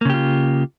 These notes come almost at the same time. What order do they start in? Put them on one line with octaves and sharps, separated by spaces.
A#3 C#3 G4 F4